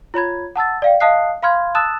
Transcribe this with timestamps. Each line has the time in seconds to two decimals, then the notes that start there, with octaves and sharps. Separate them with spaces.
0.14 F4 C#5 B5 G#6
0.56 F#5 A5 E6 A6
0.82 D5 F5 G5
1.00 D#5 F5 A5 D#6 F#6 C7
1.43 F5 B5 C6 F6 G#6
1.75 A5 D#6 E6 F#6 A6 E7